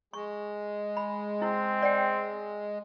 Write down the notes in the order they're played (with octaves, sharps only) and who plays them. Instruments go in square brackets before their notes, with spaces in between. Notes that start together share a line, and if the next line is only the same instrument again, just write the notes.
[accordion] G#3 [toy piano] C#6
[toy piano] B5
[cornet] C4 [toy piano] E4
[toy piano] D5 G5